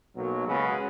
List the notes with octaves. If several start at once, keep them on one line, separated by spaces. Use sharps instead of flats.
B1 B2 F#3 A#3
C#3 G#3 C#4 F#4 B4